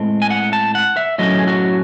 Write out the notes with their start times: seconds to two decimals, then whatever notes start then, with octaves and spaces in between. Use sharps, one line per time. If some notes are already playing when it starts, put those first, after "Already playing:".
Already playing: A2 G#3 C4
0.22 G#5
0.30 F#5
0.53 A5
0.75 F#5
0.97 E5
1.18 A2 F#3 A3 C#4 D#5
1.39 G#4
1.47 F#4